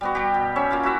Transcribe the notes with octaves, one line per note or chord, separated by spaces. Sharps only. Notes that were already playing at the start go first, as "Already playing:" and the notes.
G3 B3 F#4
G3 G4
B2
C#4 C#5 E5
A#3 F4 F5
E4 F#4 E5 F#5